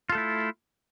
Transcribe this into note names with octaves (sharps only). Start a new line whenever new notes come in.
A3 E4 F4 A4